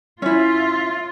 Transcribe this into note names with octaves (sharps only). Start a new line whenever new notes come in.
C#4 E4 F4 E5